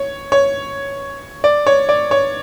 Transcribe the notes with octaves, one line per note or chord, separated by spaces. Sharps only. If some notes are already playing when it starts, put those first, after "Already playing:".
Already playing: C#5
C#5
D5
C#5
D5
C#5